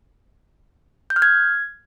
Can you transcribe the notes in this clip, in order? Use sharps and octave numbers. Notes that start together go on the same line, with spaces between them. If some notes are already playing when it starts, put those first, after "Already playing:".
G6
F6
G#6